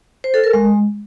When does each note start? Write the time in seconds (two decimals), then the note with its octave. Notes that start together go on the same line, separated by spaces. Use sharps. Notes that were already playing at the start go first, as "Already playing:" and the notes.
0.24 C5
0.34 A4
0.44 A#4
0.53 G#3